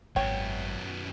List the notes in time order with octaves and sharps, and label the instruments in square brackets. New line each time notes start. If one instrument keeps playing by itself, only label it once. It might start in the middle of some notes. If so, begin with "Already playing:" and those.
[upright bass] G#1 [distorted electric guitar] F#2 B3 [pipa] C#5 [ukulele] G5